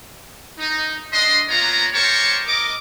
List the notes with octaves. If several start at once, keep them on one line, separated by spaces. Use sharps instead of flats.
D#4
D4 D#5 C6
A#3 B3 F4 C#5 A#5
G4 A#4 C5 C#5 A5 C#6
A#4 D#5 D6